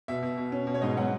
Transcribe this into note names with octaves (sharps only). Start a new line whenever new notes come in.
B2 E5
B2
B2
C#4
B2
C#5
G#2 D#5
F#3 F#5